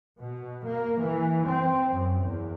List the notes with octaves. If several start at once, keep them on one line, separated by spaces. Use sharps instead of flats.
B2
A#3
E3
C4
F#2
E2